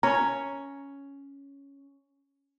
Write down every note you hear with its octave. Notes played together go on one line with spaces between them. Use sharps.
C#4 C#5 A#5